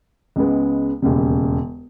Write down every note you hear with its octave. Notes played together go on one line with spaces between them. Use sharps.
C#2 C#3 G#3 B3
E1 D#2 C#3